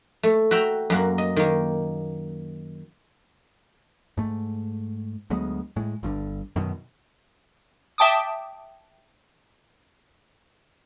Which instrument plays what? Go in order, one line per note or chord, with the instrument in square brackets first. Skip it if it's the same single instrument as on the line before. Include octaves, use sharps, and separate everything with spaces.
[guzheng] A3
F#4 E5 G5 A#5
F#2 A#3 F#4
D#5
D#3 A#3
[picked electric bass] G#2 A3
D2 F#3 G#3 B3
A2 G#3
G1 G2 D3
F#2 B2 D#3
[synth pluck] E5 G5 A5 D6 D#6